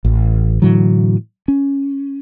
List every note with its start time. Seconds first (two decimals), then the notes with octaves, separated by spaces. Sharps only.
0.05 A1
0.62 A2 D3 E3 F#3
1.48 C#4